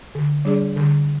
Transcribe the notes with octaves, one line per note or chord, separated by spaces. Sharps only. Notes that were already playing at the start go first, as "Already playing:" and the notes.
D3
G3 D4 G#4 D5
D3